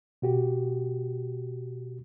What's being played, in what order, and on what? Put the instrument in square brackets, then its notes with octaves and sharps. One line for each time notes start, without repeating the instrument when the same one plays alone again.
[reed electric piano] B2 F#4 G4